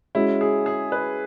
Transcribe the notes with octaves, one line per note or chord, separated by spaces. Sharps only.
G#3 C#4 E4 F#4
G#4
G#4
B4